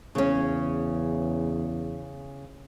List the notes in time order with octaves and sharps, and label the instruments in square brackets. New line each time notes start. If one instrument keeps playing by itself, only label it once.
[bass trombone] E2 [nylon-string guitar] C#3 C#4